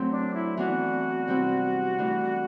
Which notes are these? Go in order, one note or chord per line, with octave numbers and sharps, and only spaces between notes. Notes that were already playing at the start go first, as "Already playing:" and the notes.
Already playing: F#3 A3 C4
D4
E4
E3 B3 D4 F#4
C3 G3 C4 E4
E3 A3 D4